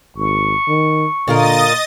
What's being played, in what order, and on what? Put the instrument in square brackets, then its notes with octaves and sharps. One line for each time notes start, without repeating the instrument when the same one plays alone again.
[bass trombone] G#1 [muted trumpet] C#6
[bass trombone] D#3
[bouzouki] A#2 F4 A#4 [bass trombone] D3 [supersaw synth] D#5 D#6 A6